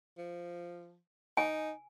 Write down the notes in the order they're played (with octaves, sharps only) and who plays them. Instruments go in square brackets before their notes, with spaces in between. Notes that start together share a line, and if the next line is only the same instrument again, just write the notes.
[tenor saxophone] F3
[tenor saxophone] D#4 [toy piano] G#5